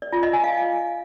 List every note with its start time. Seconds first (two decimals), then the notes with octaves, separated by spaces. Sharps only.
0.02 D5
0.12 F4
0.23 D#5
0.33 G#5
0.44 F5